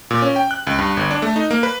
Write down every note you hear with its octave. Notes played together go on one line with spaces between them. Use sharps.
A#2
C#4
G5
F#6
C#2
G2
G1
D4
A3
D#4
A#3
B4